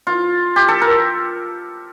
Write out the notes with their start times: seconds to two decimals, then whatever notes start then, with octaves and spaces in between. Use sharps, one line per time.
0.07 F4
0.56 G4
0.68 A4
0.82 A#4